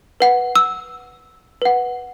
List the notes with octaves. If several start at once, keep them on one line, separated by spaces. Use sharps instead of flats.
B4 F#5
E6
B4 F#5